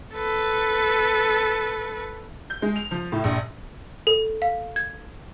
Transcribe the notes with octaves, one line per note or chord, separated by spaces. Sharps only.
A4 B4
G6
G#3
F7
F3
A2
A#1
A4
F5
G#6